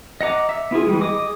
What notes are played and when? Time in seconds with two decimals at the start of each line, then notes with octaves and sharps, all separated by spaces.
0.21 D#5 F#5 A#5 D6
0.49 E5
0.71 B3 E4 F4 G#4
0.87 E3 G3 G#3
1.01 G#4 D#5 D6 D#6